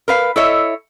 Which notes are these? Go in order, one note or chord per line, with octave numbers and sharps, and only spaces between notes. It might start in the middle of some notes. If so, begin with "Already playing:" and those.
A#4 B4 F5
E4 A4 C#5 D#5 E5